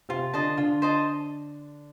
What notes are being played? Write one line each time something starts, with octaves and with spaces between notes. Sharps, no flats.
C3 C4 F4
D3 D4 C5 D#5 A5
D3 D4 F4
C5 D#5 A5